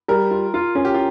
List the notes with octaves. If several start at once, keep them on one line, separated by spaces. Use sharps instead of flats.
G3 A#4
F4
F4
C#4 G#4
G4
F4